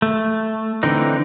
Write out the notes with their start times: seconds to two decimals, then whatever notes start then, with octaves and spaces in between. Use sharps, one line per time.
0.02 A3
0.83 D3 E3 C4 D#4